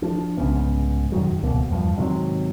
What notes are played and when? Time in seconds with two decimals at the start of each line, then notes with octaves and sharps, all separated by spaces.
0.02 F3 D4
0.37 C2 G#2 C#3 B3
1.12 E1 F#2 D#3 F#3
1.42 D#1 C#2 B2 A#3
1.70 E2 G2 F3
1.97 G#2 C3 D#3 F#3